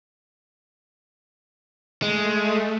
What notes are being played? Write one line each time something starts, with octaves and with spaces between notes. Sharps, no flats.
G#3 A3